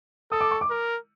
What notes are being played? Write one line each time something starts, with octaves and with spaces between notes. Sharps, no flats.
A4 D#6
D6
C#6
D6
A#4